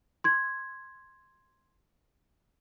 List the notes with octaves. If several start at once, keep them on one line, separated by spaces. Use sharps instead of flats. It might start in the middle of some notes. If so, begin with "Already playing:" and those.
C6 G#6